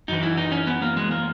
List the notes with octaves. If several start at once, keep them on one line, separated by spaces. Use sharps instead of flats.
F#2 E3 D#4
E4
D#4
C#4
B3
A#3
G#3
A#3